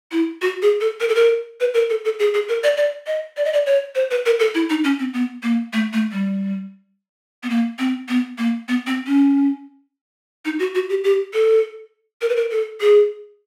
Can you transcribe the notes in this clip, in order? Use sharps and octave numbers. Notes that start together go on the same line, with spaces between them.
E4
F#4
G#4
A4
A#4
A4
A#4
B4
A#4
A4
A4
G#4
G#4
A#4
D5
D5
D#5
D5
D#5
D5
C#5
C5
B4
A#4
A4
E4
D#4
C#4
C4
B3
A#3
A3
A3
G3
B3
A#3
C4
B3
A#3
B3
C4
C#4
D#4
F#4
F#4
G4
G4
A4
A#4
B4
A#4
A4
G#4